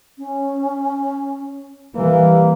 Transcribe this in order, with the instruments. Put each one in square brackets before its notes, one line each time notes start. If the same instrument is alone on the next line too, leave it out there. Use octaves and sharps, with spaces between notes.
[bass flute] C#4
[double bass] E3 [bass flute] G3 [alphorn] A#3